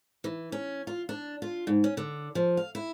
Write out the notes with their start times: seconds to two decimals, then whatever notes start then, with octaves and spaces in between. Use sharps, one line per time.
0.24 E3
0.52 C#4
0.87 F4
1.09 D4
1.42 F4
1.67 G#2
1.84 C#4
1.97 D3
2.35 F3
2.57 F5
2.75 E4